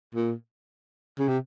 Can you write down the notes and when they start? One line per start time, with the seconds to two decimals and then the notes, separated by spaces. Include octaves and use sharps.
0.15 A#2
1.19 C#3
1.28 C3